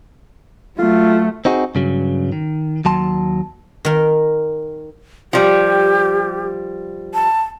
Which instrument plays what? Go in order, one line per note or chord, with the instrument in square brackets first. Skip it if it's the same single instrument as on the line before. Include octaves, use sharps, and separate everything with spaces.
[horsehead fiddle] F#3 A3 [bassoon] F4
[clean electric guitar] C4 D#4 F#4 G#4
G2 C#3 F#3
D#3
D#2 F#3 A5 C6
[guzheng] D#3 A#4
[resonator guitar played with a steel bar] F3 G3 [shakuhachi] G4
[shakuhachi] A5